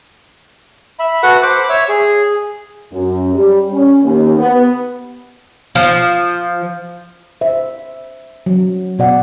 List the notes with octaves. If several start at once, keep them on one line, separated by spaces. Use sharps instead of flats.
E5 B5
F#4 A4 B4 F#5
C5 B5 D6
C#5 E5
G#4
F#2
G3
C#4
D#2
B3
F3
C5 E5
F#3
B2 D5 F#5